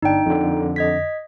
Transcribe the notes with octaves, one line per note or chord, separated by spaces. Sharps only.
G1 D4 D#4 G5
F2 D3
D#5 G#6 B6